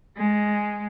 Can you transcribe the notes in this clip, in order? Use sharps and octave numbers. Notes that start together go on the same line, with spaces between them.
G#3